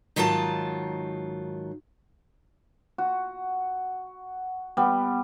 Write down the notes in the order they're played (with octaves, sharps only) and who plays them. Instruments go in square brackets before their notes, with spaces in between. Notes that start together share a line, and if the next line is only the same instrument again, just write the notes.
[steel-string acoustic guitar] G#2 D#3 F#3 F4 G#4 A5
[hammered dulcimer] F#4
G3 B3